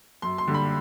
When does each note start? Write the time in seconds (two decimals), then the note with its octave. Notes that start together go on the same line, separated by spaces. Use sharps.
0.22 F#2 C6
0.38 C6
0.47 D3 G3
0.54 B5